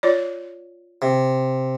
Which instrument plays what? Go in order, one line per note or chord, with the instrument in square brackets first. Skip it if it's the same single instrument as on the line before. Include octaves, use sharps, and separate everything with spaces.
[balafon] F4 C#5 D5
[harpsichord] C3